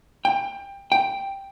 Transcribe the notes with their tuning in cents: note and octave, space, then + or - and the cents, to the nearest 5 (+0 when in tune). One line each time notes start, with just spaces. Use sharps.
G5 +20
G5 +0